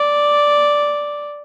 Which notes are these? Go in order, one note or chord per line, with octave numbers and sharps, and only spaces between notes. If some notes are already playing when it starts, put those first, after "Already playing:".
Already playing: D5